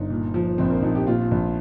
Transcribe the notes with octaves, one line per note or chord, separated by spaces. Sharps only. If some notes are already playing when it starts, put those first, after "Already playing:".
Already playing: G1 D#4
A#2
F3
A#1 C4
A#3
A#1 D#4
G4
A#2 F4
A#1